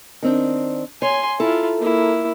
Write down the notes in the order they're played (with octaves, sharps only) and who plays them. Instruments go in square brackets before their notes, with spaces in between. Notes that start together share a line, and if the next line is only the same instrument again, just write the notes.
[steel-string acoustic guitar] D#3 C4 D4
[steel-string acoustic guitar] C#5 [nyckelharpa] G#5 C6
[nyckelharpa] E4 F4 [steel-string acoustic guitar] A4 A#5
[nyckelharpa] A#3 E4